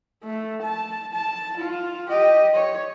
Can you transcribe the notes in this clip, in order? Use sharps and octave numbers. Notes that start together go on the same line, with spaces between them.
A3
A5
A5
F4
G4 D#5
C#5